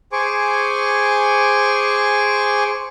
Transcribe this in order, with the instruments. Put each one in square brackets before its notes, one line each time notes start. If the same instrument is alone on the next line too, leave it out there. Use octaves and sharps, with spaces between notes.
[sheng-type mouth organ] G#4 C5 G#5 C#6 D6